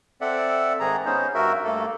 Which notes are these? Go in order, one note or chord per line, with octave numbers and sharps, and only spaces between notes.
C4 A4 D5 E5 F#5
G#2 D#3 G#4 A#5
B3 C#4 D#4 C5
G2 F#4 A#4 E5
G2 A3 A#3 A4